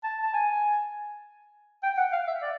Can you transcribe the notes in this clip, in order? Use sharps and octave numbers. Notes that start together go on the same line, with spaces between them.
A5
A5
G#5
G5
F#5
F5
E5
D5